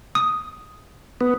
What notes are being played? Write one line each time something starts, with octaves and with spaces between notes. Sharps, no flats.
D#6
B3